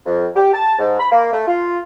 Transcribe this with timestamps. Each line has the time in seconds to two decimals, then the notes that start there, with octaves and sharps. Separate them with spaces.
0.06 F2
0.36 G4
0.53 A5
0.79 G#2
1.00 B5
1.12 A#3
1.33 A3
1.47 F4